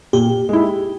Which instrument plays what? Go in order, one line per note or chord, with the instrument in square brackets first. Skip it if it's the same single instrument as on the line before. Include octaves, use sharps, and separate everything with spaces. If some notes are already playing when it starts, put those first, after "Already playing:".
[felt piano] A#2 [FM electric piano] G4
[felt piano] G#3 E4